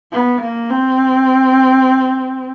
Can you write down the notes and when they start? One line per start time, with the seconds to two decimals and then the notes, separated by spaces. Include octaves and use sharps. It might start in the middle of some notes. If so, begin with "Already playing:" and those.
0.12 B3
0.41 A#3
0.70 C4